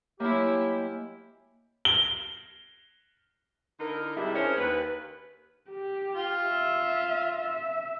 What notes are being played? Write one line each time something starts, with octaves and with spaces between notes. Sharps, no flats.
F#3 G#3 A#3 E4 G4
G7
D3 D#4 E4 A#4
G2 C3 G3 G#3 E4
C#4 D4 G#4 A#4 C5 C#5
D#2 B4
G4
F4
E5
E5